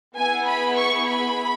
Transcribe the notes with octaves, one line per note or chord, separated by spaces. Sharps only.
B3 E4 G#4 G#5
B5
C#6
B5